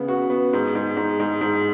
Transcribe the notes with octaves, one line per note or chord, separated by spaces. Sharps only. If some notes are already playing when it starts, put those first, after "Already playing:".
Already playing: C#3 B3
F#4
B3
G#2
G#2
G#2
G#2
G#2